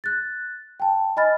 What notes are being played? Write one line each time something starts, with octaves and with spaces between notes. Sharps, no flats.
F#6 A6
G5 A5
D#5 G#5 B5 F6 A6